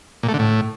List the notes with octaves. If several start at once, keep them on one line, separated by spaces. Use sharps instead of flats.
A#2
A3
D3
A2